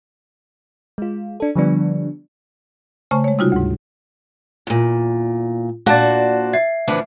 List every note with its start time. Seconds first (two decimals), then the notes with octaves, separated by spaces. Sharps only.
0.98 G#3 F4
1.40 D4 A4
1.55 D3 F3 G3 B3 D4
3.11 C#3 A3 C5 G#5 C#6
3.24 G#3 C#5
3.39 C3 G3 D#4 F4 F#4
3.52 D2 G#2
4.67 E2 A#2
5.86 A#2 D4 F#4 C5 D5 F5 A5 A6
6.53 E5 G#6 C7
6.88 D2 E3 F3 D4 B4